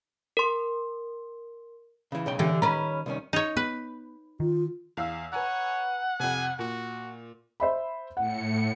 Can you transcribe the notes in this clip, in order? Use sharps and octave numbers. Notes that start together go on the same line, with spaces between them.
A#4 C6
C#3 E3
B1 C#3 G5
D3 E3 G4
D#3 C#4 B4 A#5
C2 D#3 C#4
D#4 C#5
B3 B4
D#3 F4
E2 F5 E6
B4 C#5 F#5 G#5 A#5
F2 C3 G#5
A#2 F#4
C5 E5 B5
A2 F#5 C#7